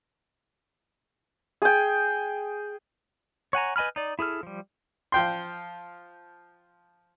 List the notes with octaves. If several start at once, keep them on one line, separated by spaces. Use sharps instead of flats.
G#4 G5
C#5 F#5 G#5 A#5
B4 D#5 G#5 B5 F6
D#4 D5
E4 G#4 A4 F6
F3 G3
F3 G5 C6